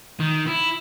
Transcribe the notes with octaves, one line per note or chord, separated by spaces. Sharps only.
D#3
E4